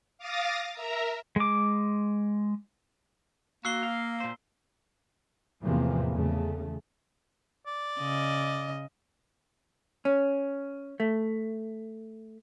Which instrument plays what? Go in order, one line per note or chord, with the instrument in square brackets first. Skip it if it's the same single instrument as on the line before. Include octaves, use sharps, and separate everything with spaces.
[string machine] F5 D6 D#6 A6 A#6
A#4 E5 A#5
[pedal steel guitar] G#3 D6
[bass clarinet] A#3 [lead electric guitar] F#4 [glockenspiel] E6 C7 G7
[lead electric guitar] F5
A#2 C5
[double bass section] E2 A2 C3 E3 F3 A#3
E2 C#3 A3
[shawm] D5
[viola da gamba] C#3 D#5
[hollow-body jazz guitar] C#4
A3